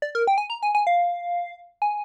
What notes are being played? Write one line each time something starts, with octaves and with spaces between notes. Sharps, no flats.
D5
A#4
G5
G#5
A#5
G#5
G#5
F5
G#5